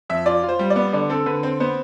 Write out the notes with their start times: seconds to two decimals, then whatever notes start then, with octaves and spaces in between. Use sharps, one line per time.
0.10 F2 E5
0.26 F4 D5
0.43 F4
0.49 C5
0.59 G3
0.70 D5
0.76 B3
0.93 D3 D5
1.10 C4 A4
1.26 D3 B4
1.43 C4 C5
1.60 B3 C5